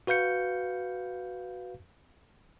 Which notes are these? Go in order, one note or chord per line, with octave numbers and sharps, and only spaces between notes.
F#4 B4 F5 G6 C#7